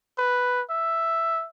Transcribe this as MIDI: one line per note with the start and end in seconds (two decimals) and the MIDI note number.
0.18 0.62 71
0.70 1.46 76